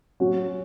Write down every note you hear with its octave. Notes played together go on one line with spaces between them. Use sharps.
F#3 C#4 F#4